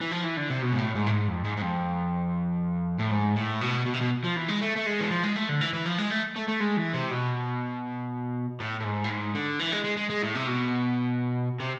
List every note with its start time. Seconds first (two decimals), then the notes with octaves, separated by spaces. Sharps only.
0.01 E3
0.12 F3
0.24 E3
0.37 D3
0.50 C3
0.62 B2
0.73 G#2
0.78 A2
0.95 G#2
1.07 A2
1.12 G#2
1.28 F2
1.45 G#2
1.57 G#2
1.62 F2
2.99 A2
3.11 G#2
3.36 A2
3.61 B2
3.86 B2
3.94 C3
4.01 B2
4.24 F3
4.36 E3
4.48 G#3
4.61 A3
4.76 A3
4.86 G#3
5.01 E3
5.10 F3
5.23 G#3
5.36 A3
5.49 D3
5.61 E3
5.73 E3
5.86 F3
5.98 G#3
6.10 A3
6.36 A3
6.48 A3
6.60 G#3
6.77 E3
6.93 C3
7.10 B2
8.60 A2
8.80 A2
8.84 G#2
9.04 A2
9.10 G#2
9.35 D3
9.60 E3
9.73 G#3
9.85 G#3
9.97 G#3
10.10 G#3
10.22 A2
10.35 C3
10.47 B2
11.60 C3